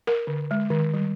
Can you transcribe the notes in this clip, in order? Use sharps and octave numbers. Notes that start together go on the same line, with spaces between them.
A#4
D3
G#3
D#3
G3